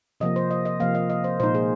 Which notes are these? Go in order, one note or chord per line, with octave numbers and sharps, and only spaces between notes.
C3 F3 A#3 D#5
C5
D#5
D#5
C3 F3 A#3 F5
D#5
D#5
C5
A#2 G#3 D#4 C5
G#4